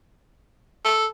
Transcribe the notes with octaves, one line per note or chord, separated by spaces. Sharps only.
A4